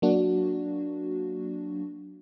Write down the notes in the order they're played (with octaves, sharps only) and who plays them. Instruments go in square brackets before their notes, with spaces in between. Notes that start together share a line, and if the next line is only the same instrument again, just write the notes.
[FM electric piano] F#3 A#3 D4 F#4